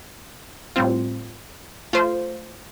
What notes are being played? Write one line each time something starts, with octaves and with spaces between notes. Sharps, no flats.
A2 G3 C4 F4
A3 F4 C5